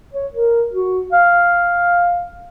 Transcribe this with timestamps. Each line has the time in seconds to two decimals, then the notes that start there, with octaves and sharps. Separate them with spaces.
0.13 C#5
0.33 A#4
0.73 F#4
1.12 F5